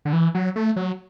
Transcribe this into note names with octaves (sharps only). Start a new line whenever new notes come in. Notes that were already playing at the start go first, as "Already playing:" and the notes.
D3
E3
F#3
A3
F#3